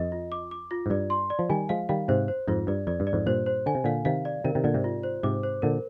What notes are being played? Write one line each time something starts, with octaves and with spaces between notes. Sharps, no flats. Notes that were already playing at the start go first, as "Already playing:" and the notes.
Already playing: F2 D#5
F4
D6
D6
F4
G#2
G2 D5
C6
D5
F3
D#3 G3 G#5
F3 G#3 F5
D#3 G3 F5
G#2 C3 C5
C5
F2 G#2 F4
G2 D5
F2 D5
G2
D5
F2 G#2
G2 A#2 C5
C5
D3 G#5
C3
A#2 D3 F5
C3 D#3 F5
D5
C3 D#3 A#4
C3 D#3
A#2 D3 D5
G#2 C3
F4
C5
G#2 C3 D6
C5
A#2 D3 A#4